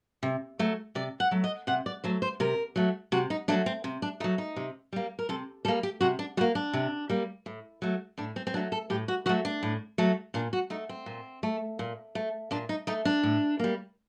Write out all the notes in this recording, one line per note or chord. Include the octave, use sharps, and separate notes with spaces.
C3
F#3 A3
C3 D5
F#5
F#3 A3
D#5
C3 F#5
D5
F#3 A3 C5
C5
C3 A#4
F#3 A3
C3 F#4
D#4
F#3 A3 D4
C4
C3
D4
F#3 A3 D#4
D#4
C3
G3 A#3
A#4
C3 A4
G3 A#3 A4
G4
C3 F#4
D4
G3 F#4
A#3
D4
C3
G3 A#3
A2
F#3 A3
A2 D4
C4
C4
F#3 A3 D4
A4
A2 G4
F#4
F#3 A3 F#4
D4
A2
F#3 A3
A#2 D4
F#4
A3 D#4
C4
A#2
A3
A#2
A3
A#2 D4
D#4
A3 D#4
D4
A2
G3 A#3